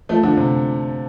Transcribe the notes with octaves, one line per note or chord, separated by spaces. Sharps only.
F3 A3
D3 F3
C3